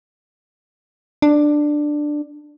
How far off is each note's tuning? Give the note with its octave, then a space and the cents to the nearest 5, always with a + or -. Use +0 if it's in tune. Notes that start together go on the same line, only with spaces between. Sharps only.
D4 +10